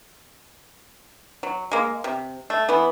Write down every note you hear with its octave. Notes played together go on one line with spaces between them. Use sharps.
F#3
G#3 A#3
C3
A3
E3 B3